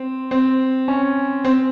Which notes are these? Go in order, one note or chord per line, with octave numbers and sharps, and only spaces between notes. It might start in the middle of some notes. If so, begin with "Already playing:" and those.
Already playing: C4
C4
C#4
C4